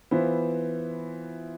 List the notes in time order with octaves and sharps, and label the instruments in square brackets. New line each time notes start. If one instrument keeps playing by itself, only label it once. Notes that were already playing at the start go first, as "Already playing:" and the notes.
[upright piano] E3 B3 F4 C5 E5